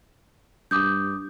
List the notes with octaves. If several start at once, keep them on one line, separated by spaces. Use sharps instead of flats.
G2 D6 D#6 G6